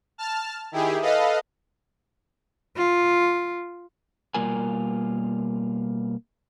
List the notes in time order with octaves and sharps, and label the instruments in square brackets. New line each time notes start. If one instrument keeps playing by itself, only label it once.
[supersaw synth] A5 F6
D#3 E4 G4 G#4
A4 B4 D#5 F5
[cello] F4
[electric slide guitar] B2 G3 A#3 F4 A#4 G#5